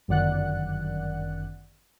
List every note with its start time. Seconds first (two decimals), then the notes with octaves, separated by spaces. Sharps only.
0.08 G1 F#2 D#3 D5 F#5 F#6